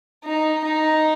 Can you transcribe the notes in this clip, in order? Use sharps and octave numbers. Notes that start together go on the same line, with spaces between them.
D#4
D#4